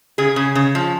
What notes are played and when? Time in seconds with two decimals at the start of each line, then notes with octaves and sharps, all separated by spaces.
0.18 C#3 G#4
0.36 C#3
0.55 C#3
0.75 F3